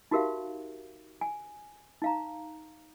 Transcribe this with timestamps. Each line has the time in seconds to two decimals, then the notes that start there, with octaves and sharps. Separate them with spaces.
0.11 D#4 F#4 G4 A#4 E5 F5
1.21 G#5
2.02 D#4 F5 A#5